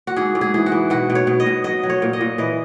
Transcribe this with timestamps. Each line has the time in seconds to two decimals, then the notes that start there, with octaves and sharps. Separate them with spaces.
0.07 F#4
0.16 G#2 G#4
0.35 G#2
0.41 G#4
0.54 E3 G#4
0.66 F#4
0.72 E3
0.90 B2 F#4
1.10 B2
1.15 C#5
1.27 B2
1.40 D#5
1.46 B2
1.64 F#3 D#5
1.83 F#3
1.90 C#5
2.02 A#2
2.13 D#5
2.21 A#2
2.38 E3 D#5